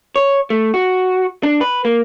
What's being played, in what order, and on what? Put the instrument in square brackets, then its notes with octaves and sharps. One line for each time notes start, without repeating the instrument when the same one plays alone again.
[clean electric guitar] C#5
A3
F#4
D4
B4
A#3